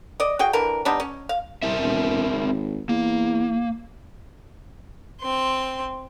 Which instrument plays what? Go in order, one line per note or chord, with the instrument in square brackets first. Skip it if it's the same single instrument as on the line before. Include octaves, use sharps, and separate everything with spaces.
[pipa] D5 D#5
F#4 G#4 G5
D3 E3 A#4
G3 B3 D4 D#4
C#4
F5
[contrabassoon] C2 [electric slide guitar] C4 A#4 E5
[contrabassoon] E1
G#1
[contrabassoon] E2 [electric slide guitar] A#3
[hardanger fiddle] C4 C6